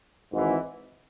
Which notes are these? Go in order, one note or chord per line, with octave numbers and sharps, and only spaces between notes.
G#1 G#2 E3